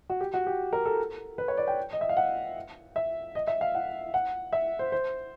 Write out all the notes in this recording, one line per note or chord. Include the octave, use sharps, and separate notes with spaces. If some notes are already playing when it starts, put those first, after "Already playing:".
F#4
G4
F#4
G4
A#4
A4
B4
C#5
D5
G5
D#5
E5
F5
F#5
E5
D#5
E5
F5
F#5
F#5
E5
C5
C5